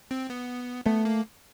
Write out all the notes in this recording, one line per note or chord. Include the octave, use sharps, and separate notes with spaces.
C4
B3
A3 B3
A#3